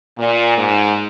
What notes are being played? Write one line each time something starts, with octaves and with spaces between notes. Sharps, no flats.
A#2
G#2